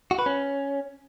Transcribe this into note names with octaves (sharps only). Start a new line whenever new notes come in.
F#4
B4
C#4